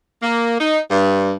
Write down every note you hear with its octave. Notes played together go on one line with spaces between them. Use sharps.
A#3
D#4
G2